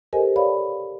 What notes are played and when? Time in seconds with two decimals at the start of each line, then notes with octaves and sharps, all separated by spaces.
0.13 G4 A4 A#4 C5 D#5 G#5
0.36 C#5 D5 F5 B5